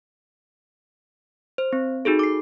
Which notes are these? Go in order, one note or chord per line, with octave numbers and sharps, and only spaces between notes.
C5
C4
D#4 F#4 G#4 A4
D6 C7